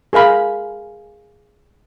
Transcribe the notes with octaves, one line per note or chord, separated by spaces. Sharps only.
G#4 A#4 F5 B5